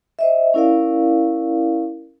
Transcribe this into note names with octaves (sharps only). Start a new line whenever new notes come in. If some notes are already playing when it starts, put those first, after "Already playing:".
C5 D#5 E5
C#4 E4 A#4 D5 F5